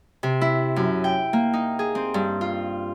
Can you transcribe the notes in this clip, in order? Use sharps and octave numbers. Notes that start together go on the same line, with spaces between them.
C3
E4
F#2
G5
A#3
D#4
G#4
C4
G2
F4